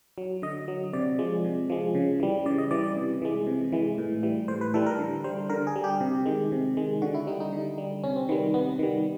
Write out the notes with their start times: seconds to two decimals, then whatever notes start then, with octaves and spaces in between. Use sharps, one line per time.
0.18 F#3
0.42 D3 D#5
0.68 F#3
0.93 C3 D5
1.19 F3 G#3
1.44 C3
1.70 F3 G#3
1.95 C#3
2.20 E3 G3
2.46 C#3 D5
2.58 D#5
2.71 E3 G3 D5
2.83 D5
2.96 C3
3.22 E3 G#3
3.47 C3
3.72 E3 G#3
3.98 A2
4.23 E3 G3
4.48 A2 C5
4.61 B4
4.74 E3 G3 A4
4.86 A#4
4.99 D3
5.24 G3 C5
5.50 D3 A#4
5.67 G#4
5.76 G3
5.84 G4
6.01 C3
6.26 D#3 G#3
6.52 C3
6.77 D#3 G#3
7.02 D3 F#4
7.15 E4
7.27 G3 D#4
7.40 D#4
7.52 D3
7.78 G3
8.04 C3 C#4
8.16 C4
8.29 D#3 B3
8.32 G3
8.54 C3 B3
8.79 D#3 G3